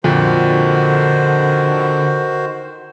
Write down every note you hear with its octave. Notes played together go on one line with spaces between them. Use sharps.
F2 A#2 D3 D#3 F#4 C5